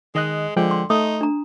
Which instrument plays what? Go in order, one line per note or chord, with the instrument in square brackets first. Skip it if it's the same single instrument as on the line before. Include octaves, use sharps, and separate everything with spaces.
[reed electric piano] D#3 D#5 F#6 [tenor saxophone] G#3
[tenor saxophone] D3 [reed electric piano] F3 G#3 G5
[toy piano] C6
[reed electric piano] A3 [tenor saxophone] D#4 [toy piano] D#6
[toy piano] D4 A#5